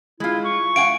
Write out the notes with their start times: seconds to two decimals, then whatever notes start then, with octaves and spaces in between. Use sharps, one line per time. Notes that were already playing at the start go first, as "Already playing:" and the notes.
0.20 G#3 E4 F4
0.44 C#6
0.76 F5 F#5 G#5 D7